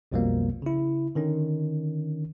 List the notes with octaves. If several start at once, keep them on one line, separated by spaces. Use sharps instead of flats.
B1 F2 B2 F3 G3 A#3
C#3 E4
D3 D#3 C#4